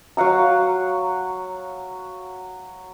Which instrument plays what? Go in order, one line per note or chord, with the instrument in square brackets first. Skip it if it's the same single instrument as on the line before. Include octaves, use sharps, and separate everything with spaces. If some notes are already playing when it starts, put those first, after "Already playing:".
[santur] F#3 F5 F#5 A#5